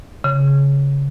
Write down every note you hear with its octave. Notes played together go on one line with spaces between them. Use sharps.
C#3